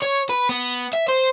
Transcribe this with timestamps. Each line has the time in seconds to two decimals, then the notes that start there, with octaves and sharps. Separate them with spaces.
0.02 C#5
0.29 B4
0.49 B3
0.93 E5
1.08 C5